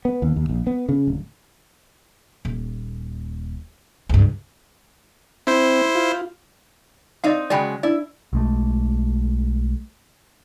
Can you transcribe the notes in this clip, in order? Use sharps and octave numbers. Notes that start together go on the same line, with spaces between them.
B3
D#2
D#2
A#1
B3
C#3
D1
D#1
C#2 G2
C4 E4 C5
F4
C4 D#4 D5 D#5 F5
C#3 F#3 G#3 D5 G5 B5
D4 E4 D5
B1 G#3 A3